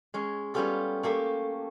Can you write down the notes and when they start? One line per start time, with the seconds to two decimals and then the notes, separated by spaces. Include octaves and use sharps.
0.14 G#3 C#4
0.54 G3 B3 C#4 F4 G4 A4
1.03 A3 A#3 G4 A4